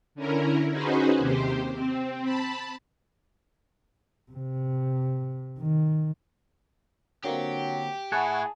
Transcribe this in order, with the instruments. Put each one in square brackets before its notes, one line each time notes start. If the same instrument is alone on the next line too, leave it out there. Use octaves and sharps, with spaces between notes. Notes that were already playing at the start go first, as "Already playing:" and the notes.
[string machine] D3 C#4 E4 A#4
C#4 D#4 F#4 G#4 B4 C5
D#2 C3 G4 C5
C4
A5 B5
[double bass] C3
D#3
[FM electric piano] D3 A#3 C4 [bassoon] F#3 [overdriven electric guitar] G4
[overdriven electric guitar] A2 E4 [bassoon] G#4 [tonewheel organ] F#5 G#5 C#6 [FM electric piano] A5